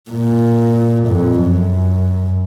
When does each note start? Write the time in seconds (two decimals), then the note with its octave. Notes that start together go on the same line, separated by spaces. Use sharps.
0.10 A#2
1.08 F2
1.41 F#2